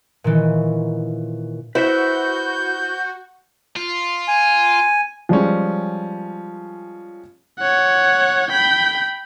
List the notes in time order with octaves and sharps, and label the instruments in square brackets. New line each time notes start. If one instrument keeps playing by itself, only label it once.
[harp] A#2 D#3 E3 C#4
[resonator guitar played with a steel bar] E4 [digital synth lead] F#4 [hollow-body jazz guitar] B4 C5 E5 [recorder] G6
[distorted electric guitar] F4
[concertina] G#5
[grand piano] F3 G3 G#3 C#4
[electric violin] C#5 F#5
G5 B5